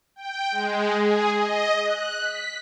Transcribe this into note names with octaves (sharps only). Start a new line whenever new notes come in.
G5
G#3
G#4
D#5
F#6
B6